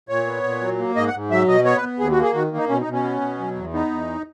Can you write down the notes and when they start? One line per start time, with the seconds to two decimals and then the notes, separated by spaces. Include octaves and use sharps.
0.09 A#2 C#5
0.27 B3
0.43 A#2
0.61 F#3
0.79 A#3
0.95 G#2 D#5
1.07 F#5
1.13 G#2
1.31 F#3 E5
1.48 B2 D#5
1.65 B3 C#5
1.77 B4
1.82 B3
1.99 D#2 G#4
2.12 F#4
2.17 A#3
2.23 G#4
2.35 D#3 F#4
2.51 A#3
2.57 D#4
2.69 B2 C#4
2.81 D#4
2.86 B2
2.93 C#4
3.04 B3
3.21 B2
3.39 F#3
3.56 E2
3.73 B3 D#4
3.90 E2